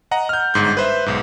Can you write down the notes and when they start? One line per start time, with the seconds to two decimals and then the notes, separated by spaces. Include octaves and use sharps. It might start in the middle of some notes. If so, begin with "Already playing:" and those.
0.11 D#5 F#5 A#5
0.29 F6 G6
0.54 G1 G#2 G6
0.77 B4 C5 E5
1.06 B1 G#2